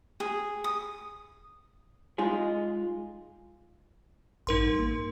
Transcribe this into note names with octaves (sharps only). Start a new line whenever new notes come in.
G#4
D#6
G#3 D#4 F4 G#4
A1 G2 D#4 A#4 C6
A#3